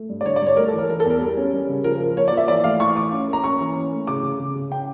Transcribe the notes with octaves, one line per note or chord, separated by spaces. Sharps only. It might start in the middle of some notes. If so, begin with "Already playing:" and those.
Already playing: A3
G2
D5
D3 C#5
D5
G2 C#5
A3 A#4
A4
E3
A#4
E3 A#4
A4
E2 A#4
G3
C#4
G3
C#3
F3 A#4
F3
A#3 C#5
D5
F3
E5
E3 D5
A3 F5
E3 C#6
A3 D6
C#4
A#3 A#5
C#4 C#6
E3
C#4
A3
C#3 D6
C#3
C#3
C#3
C#4 G5